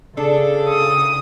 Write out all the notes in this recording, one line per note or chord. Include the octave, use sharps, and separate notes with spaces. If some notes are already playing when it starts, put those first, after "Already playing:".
C#3 D4 G#4 A4
D#6